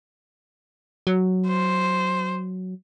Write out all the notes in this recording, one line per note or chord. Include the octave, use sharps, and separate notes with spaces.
F#3
C5